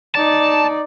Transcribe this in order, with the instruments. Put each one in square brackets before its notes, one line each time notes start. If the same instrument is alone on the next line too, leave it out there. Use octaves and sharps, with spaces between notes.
[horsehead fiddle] D#4 D5 [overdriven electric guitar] A5